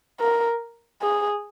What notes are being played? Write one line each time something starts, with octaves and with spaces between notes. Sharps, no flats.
A#4
G#4